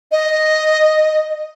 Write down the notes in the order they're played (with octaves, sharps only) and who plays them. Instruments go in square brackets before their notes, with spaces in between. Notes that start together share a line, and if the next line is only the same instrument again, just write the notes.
[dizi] D#5